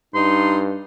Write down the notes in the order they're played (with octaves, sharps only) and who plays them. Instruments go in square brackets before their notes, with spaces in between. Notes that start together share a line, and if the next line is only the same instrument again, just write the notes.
[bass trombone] G2 [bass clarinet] D#4 [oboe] C6